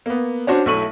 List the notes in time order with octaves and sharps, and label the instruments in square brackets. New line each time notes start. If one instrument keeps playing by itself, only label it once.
[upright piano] A#3 B3
C#4 D4 F#4 C5
B1 A3 E4 C#6 D#7 F#7